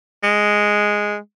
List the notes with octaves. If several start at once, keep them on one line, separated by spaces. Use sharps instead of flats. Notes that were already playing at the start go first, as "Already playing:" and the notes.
G#3